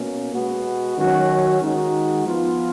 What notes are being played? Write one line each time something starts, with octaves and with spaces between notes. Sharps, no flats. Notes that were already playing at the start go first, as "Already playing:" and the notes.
Already playing: B2 A#3 C#4
B2 G#3 B3 F#4
D#3 F#3 C#4 F#4
D#3 G#3 D#4 F#4
F3 B3 F4